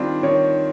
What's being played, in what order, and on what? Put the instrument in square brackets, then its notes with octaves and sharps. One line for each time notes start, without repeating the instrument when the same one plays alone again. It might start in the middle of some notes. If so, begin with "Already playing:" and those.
Already playing: [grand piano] D#3 G3 C4 F4 [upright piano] D4
[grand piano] D#3 [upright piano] C#5